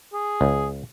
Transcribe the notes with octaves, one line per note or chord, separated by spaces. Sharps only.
G#4
C#2